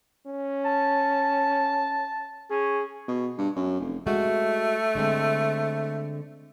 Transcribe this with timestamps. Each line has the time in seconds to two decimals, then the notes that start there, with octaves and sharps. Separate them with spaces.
0.27 C#4
0.65 A5
2.50 C#4 G#4
3.08 B2
3.38 G2
3.56 F#2
3.80 F1
4.07 G#3 A3 F#4
4.95 D3 G#3 C4